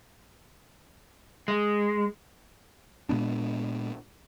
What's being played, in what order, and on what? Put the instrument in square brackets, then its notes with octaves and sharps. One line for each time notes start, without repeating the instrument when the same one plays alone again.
[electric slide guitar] G#3
[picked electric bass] A#2 G#3 B3 D4